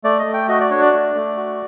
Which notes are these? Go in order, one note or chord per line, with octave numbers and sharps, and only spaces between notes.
A3 D5
D#5
A3
G5
F#4 D#5
D5
D4 C#5
D5
A3
A3
F#4